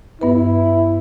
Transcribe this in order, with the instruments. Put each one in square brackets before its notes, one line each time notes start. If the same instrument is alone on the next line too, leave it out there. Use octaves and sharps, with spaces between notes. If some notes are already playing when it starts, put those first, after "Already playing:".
[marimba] G2 B3 B4 [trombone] E4